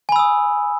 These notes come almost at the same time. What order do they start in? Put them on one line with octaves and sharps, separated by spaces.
G#5 B5 E6 D#6